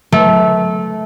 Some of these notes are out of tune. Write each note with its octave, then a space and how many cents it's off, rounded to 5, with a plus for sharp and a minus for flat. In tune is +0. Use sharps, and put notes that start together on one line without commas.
A3 -20